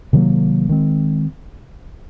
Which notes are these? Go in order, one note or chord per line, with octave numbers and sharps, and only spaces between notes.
C3 D#3 F#3 A#3
D#3 G#3 C4